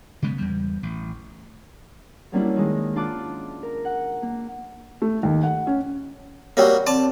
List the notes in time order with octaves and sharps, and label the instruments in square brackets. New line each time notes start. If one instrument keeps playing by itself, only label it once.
[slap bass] C#3 G#3 B3
E2 G3
A1
[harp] F#3 G3 A#3 C#4 D4 E4
D#3 G#3
D4 F4 A5 D6 F#6
A#4
F#5
A#3
[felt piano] A3
D#2
F#5
C#4
[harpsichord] F#3 G3 A#3 [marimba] C#5
[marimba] C4 [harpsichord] D5 A5